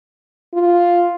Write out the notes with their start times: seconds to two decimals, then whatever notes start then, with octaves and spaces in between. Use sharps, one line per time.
0.54 F4